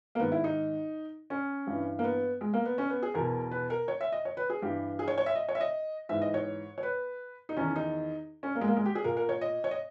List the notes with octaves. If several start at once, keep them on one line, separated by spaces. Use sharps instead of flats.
A#3
G#2 D#3 B3
E4
D#4
C#4
G2 E3
A#3
B3
G#3
A#3
B3
C#4
B3
G#4
E2 B2 A#4
B4
A#4
C#5
E5
D#5
C#5
B4
G#4
G2 E3 G4
G#4
C#5
C#5
E5
D#5
C#5
E5
D#5
G#2 E3 E5
D#5
C#5
C#5
B4
D#4
E2 D#3 C#4
D#4
C#4
A#3
G#3
A#3
G#3
G4
G#4
A#2 A#4
A#4
C#5
D#5
C#5
D#5